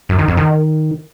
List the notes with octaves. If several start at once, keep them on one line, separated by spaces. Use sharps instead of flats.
F#2
D#3
F2
D#3